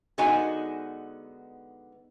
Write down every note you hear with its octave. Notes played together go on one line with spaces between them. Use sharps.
D3 G#3 B3 D#4 F#4 G#5